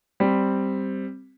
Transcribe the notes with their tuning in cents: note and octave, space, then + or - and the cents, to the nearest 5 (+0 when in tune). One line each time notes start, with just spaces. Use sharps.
G3 +0 C4 +0